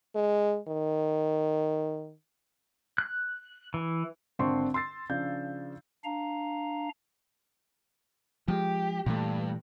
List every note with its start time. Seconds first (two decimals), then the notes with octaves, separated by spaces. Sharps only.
0.15 G#3
0.68 D#3
2.98 F#6
3.74 E3
4.39 G#1 D3 C4 A5 C6 C#6
4.74 C6 E6 A6 C7
5.09 C#3 F3 D4 G6
6.04 D4 F5 A#5
8.48 F3 G#3 G4
9.06 G2 A#2 E3 A3